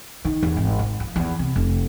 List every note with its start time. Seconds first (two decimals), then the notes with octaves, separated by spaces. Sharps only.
0.25 D#3
0.43 E2
0.57 G#1
0.79 G#2
1.00 F3
1.16 E2
1.39 C3
1.56 F1